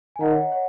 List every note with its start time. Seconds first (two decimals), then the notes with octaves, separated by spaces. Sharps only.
0.16 G#5
0.20 D#3 F#5 A#5
0.31 C#5 F#5
0.42 D#5
0.52 C#5 F#5